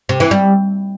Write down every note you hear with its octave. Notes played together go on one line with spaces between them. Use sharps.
C3
E3
G3